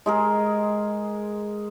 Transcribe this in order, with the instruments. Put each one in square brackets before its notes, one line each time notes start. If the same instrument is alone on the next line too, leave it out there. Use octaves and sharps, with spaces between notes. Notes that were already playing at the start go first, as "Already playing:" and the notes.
[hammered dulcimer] G#3 G#4 A#4